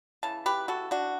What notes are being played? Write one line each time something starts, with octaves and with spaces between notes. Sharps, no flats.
C#3 E3 A5
G4 B4
F#4 A4
D4 F#4